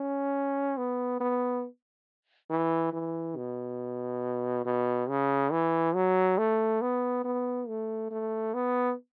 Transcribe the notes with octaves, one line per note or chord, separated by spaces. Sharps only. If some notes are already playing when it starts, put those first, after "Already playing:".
Already playing: C#4
B3
B3
E3
E3
B2
B2
C#3
E3
F#3
A3
B3
B3
A3
A3
B3